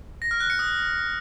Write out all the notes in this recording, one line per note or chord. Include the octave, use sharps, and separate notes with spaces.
A#6
F6
F#6
C#7
D#6